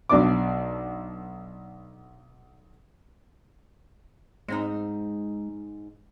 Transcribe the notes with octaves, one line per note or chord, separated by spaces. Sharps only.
B1 B2 D4 D5 D6
G#2 G#3 C4 D#4